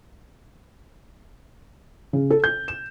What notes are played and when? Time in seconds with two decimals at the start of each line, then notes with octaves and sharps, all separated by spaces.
2.13 C#3
2.30 A4
2.44 G6
2.68 E7